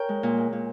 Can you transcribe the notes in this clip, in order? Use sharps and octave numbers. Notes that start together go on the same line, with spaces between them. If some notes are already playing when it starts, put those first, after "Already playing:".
Already playing: A#4 C#5 G5
G#3
A#2
G#3
A#2